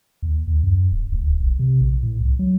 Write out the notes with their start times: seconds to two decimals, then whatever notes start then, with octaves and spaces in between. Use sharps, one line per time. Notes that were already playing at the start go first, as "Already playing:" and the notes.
0.22 D#2
0.47 D#2
0.64 F#2
0.91 D1
1.12 D2
1.28 D1
1.40 B1
1.59 C3
1.81 A#1
2.03 A2
2.20 C2
2.39 F#3